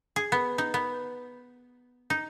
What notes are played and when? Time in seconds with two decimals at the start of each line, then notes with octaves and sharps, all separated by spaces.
0.16 G#4
0.32 B3
0.58 D#4
0.74 B3
2.10 D#4